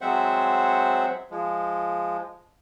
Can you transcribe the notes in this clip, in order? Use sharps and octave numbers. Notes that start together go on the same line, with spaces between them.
F#3 G#3 C4 C5 E5 F#5
F3 G#3